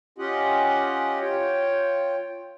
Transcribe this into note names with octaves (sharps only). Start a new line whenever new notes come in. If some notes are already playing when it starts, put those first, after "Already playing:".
C#4 F4 G4 D#5 F#5
F4 C#5 G5